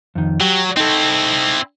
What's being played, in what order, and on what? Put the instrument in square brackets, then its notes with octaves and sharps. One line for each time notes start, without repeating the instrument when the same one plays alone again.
[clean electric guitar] F2 D#3
[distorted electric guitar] F#3 [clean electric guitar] G4
[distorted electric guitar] C4 E4 [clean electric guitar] D#4 A4